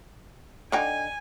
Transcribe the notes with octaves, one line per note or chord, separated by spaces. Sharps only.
D3 D#4 G5 G#5